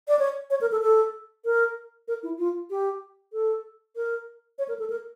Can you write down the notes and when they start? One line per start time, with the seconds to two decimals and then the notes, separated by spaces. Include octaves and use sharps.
0.08 D5
0.19 C#5
0.50 C#5
0.61 A#4
0.72 A4
0.82 A4
1.45 A#4
2.08 A#4
2.23 E4
2.38 F4
2.70 G4
3.33 A4
3.96 A#4
4.58 C#5
4.68 A#4
4.79 A4
4.90 A#4